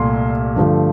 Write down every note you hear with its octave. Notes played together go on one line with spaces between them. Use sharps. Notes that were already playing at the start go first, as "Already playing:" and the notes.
Already playing: C2 A#2 A3 C6
G2 D3 F3 A3